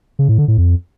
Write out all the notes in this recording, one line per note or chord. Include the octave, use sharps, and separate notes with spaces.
C#3
A2
D3
A2
F2